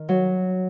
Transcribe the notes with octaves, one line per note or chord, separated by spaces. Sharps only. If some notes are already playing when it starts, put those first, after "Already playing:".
Already playing: D#3
F#3